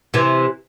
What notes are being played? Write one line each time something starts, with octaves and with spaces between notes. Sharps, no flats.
C3 E3